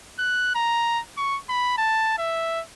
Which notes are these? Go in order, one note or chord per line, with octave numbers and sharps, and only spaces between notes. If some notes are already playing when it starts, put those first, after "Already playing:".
F#6
A#5
C#6
B5
A5
E5